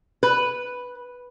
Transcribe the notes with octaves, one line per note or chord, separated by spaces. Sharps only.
B4